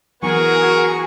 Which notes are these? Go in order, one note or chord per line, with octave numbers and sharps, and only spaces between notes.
E3 F#3 B3 F#4 G#4 A#4 C#6